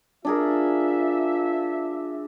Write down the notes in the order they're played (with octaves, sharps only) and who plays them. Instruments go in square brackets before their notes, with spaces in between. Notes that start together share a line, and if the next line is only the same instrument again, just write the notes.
[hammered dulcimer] D4 G#4 A#4 [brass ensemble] F4 E5